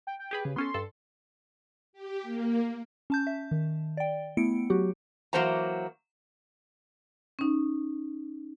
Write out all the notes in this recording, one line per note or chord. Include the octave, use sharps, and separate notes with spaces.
G5
G5
G4 G#4 B4
C#3
B3 C#4 A4 C6
G2 A4
G4
A#3
C#4 A5 G6
E5
D#3
D5 G5
A3 B3 E4 C#7 D7
F#3 F#4 G4
E3 F#3 A#3 C5 F#5 A#5
C#4 D#4